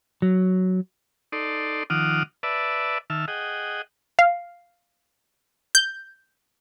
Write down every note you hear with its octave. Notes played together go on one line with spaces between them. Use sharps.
F#3
D#4 A4 D5 C6
D#3 F3 F#5 D6 D#6 F6
B4 D5 E5 A5
D#3 E5 A5 F6
G#4 D#5 F#5 G5
F5
G6